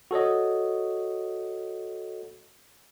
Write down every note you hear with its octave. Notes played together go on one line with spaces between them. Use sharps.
F#4 A4 C#5 D#5